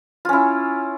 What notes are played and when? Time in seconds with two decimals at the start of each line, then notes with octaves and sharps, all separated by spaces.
0.25 F4
0.29 C#4
0.33 E4